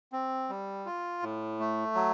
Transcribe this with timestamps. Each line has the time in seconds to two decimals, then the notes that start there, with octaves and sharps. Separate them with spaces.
0.12 C4
0.49 G3
0.86 F4
1.22 A2
1.60 A3
1.95 F#3